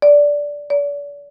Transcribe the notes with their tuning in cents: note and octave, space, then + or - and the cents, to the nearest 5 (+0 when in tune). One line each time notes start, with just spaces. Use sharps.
D5 -10
D5 -40